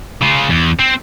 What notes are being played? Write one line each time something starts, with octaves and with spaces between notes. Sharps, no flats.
C#3 F4
E2
C4